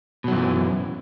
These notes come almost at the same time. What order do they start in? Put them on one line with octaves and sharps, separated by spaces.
B2 F#3 F#2 E3